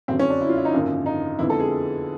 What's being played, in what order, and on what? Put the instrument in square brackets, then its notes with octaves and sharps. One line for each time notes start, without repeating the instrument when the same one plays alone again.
[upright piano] F#1 F2 D3 F#3 [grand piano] C4
[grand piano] C#4
D4
E4
F4
E4
D#4
[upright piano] G#1 F#2 D3 F3 A#3
[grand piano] D#4
[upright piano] F2 D3 F3 G#3 B3 [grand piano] E4
[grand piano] A4
G#4